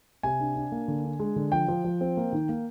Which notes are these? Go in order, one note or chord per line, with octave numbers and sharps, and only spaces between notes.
C3 G#5
D4
D4
A#3
D3
D4
G#3
D3
F3 G5
F3
F3
C4
A#3
D#3
A#3